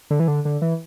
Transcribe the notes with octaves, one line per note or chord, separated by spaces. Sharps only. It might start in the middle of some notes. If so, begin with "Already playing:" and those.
D3
E3
D3
D3
E3